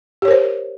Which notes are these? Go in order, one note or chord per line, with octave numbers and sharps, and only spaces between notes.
G4 A#4 C5 C#5